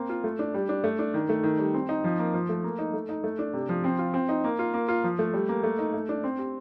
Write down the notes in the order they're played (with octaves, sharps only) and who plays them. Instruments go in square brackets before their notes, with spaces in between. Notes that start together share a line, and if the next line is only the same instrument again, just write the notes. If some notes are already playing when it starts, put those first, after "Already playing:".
Already playing: [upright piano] A#3 C4
F4
A3
D4
G3
D4
A3
D4
D#3
A3
D#3
G3
C4
D#4
F3
A#3
F3
A3
A#3
D#4
A3
D#4
A3
D4
C3
F3
C4
F4
C4
D#4
A#3
F4
A#3
F4
F3
A3
G3
A#3
A3
D#4
A3
D4
C4
G4